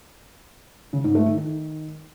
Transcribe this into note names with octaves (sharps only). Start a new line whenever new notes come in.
C#3
G#2
A3
D#3
D#3